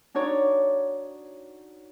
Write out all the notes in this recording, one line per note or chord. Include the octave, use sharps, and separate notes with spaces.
D4 D#4 F#4 C#5 D5